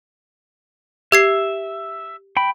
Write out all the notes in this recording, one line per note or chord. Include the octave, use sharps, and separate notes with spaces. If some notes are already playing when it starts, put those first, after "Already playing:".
G4 E5 G#6 C7
G5 B5